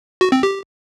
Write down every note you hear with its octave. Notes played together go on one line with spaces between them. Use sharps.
F#4
C4
G4